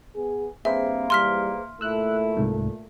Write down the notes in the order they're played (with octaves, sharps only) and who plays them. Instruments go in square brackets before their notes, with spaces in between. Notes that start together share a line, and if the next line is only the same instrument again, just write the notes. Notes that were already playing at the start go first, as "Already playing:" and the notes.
[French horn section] B3 G#4
[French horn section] G2 C4 [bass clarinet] A#3 [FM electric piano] G#4 B4 C5 [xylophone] E5
[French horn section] G#2 E3 G3 [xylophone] C6 F6 B6
[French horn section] A#2 A3 [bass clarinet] E4 [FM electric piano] E6 F#6
[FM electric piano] C2 G#2